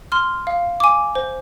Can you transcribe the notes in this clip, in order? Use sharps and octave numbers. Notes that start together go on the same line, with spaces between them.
C6 F6
F5
G#5 D6
C5